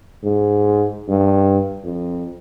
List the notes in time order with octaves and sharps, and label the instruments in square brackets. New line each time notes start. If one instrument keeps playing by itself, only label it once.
[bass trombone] G#2
G2
F2